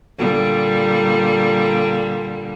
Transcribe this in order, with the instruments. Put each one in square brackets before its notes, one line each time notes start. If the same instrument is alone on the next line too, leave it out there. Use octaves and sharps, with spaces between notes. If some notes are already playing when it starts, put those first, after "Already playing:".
[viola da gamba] A#2 D3 G3